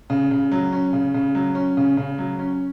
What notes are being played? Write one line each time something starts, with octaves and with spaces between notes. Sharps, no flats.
C#3
C#3
F#3
C#4
C#3
C#3
F#3
C#4
C#3
C#3
F#3
C#4